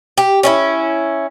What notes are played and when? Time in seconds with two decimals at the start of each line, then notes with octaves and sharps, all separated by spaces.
0.18 G4
0.43 C#4 D#4 E4